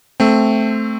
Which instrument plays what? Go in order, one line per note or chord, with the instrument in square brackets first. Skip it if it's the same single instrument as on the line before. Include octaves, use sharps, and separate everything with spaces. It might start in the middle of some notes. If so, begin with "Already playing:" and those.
[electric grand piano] A3 C4